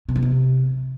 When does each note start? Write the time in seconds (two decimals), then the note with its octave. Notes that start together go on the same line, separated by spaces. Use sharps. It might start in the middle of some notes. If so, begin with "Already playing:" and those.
0.09 C3
0.16 E2
0.23 C3